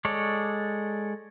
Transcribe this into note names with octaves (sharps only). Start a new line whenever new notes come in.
G#3 A4 C#5 D5